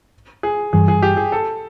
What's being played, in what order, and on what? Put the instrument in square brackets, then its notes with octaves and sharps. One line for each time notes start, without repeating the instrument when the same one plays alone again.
[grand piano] G#4
[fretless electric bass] G2 E3 G3 [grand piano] G#4
[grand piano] G#4
G4
G#4
A4